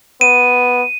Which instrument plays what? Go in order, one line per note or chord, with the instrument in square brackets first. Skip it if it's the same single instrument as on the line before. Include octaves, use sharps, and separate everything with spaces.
[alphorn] B3 [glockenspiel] D#7